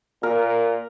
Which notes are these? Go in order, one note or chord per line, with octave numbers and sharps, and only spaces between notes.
A#2 A#4